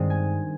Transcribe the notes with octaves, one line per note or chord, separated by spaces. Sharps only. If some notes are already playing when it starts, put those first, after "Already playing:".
Already playing: G2 D#3 G#3 C4
G#5